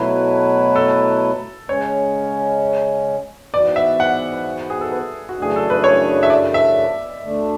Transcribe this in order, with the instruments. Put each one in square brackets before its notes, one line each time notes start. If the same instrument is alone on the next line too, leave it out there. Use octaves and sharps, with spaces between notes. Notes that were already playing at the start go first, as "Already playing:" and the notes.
Already playing: [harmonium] B2 F#3 A3 E4 B4 [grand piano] F#4
[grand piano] A4
[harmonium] C#3 G#3 C#4 [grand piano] C#5
[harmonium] G#2 E3 B3 F#4 [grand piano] D5
[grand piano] E5
F#5
G#4
A4
B4
F#4
[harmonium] F#2 C#3 E3 A3 D4 [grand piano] G#4
[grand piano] A4
B4
C#5
E5
D5
E5
[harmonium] D2 D3 A3 D4